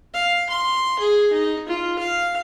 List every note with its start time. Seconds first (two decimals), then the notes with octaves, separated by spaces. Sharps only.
0.14 F5
0.49 C6
0.99 G#4
1.32 D#4
1.68 F4
1.98 F5